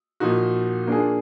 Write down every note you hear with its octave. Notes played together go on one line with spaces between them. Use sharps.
A#2 F3 A#3 D#4 F#4
A#3 D4 F4 G#4